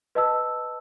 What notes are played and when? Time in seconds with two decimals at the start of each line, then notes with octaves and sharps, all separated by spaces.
0.15 B4 D#5 A5 E6